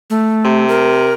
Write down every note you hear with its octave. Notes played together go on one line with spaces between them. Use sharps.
A3
C3
A#4